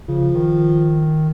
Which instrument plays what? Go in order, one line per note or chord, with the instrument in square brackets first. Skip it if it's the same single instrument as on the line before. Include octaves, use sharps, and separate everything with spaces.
[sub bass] C#3 [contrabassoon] F3
[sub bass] D#3